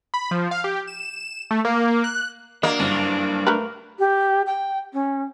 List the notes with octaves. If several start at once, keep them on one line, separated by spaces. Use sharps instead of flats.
B5
F3
F5
G4
E7
E7
A3
A#3
F#6
F#3 A#3 D4 D#5
F#1 G2
A3 A#4 B4
G4
G5
C#4